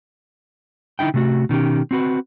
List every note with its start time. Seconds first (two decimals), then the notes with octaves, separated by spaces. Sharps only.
0.99 D3 D#4 E4 G5
1.14 C3 A3 F#4
1.49 B2 D#3 C#4 G4
1.91 C4 F#4 B4